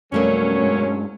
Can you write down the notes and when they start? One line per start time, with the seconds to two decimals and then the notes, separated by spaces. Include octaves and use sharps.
0.12 F2 B2 F#3 G3 A3 A#3 C#4
0.61 G2 G#3